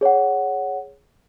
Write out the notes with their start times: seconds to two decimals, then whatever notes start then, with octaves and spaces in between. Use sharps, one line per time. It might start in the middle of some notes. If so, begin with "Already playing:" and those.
0.01 G#4 C#5 F#5